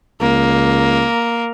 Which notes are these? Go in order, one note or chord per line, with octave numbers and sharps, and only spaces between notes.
C#2 A#3